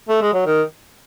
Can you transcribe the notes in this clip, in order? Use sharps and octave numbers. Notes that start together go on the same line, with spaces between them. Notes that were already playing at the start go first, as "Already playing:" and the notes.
A3
G#3
F#3
D#3